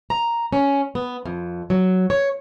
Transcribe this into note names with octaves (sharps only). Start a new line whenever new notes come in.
A#5
C#4
B3
F2
F#3
C#5